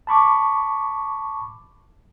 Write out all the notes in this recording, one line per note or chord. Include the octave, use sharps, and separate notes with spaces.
A5 B5 C#6 D6